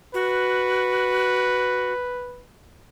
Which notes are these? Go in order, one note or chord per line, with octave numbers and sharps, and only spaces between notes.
F#4 B4